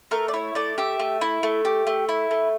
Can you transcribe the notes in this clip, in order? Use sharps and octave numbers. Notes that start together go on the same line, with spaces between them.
A3 A#4
D5
E4 C#5
A3 D5
G4 E5
A3
E4
A3
G4
A3
E4
A3